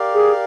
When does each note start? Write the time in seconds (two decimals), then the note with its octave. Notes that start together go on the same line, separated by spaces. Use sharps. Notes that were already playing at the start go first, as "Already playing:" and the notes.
Already playing: G4 A#4 D5 F5
0.13 G#4